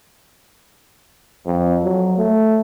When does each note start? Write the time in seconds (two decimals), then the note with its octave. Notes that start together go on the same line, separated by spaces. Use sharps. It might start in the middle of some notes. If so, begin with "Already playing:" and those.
1.46 F2
1.85 F#3
2.18 A3